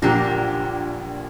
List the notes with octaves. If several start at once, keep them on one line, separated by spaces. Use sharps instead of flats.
A#1 A#2 F#3 A#3 D4 G4